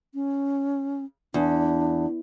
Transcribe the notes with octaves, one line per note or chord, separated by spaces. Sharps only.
C#4
E2 D4